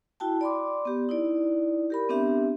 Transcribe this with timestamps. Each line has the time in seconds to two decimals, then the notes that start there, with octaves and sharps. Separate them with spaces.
0.20 E4 F#4 G5 A5
0.41 D5 B5 C6 D6
0.85 B3 G4
1.09 D#4 E4 D5
1.90 G4 A#4 B5
2.09 B3 C4 D4 G4 E5